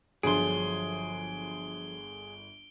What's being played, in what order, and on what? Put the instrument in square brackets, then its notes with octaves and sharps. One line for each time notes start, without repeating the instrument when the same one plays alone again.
[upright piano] G1 D3 C6 [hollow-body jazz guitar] F3 F#3 [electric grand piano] G#4 [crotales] D7 G7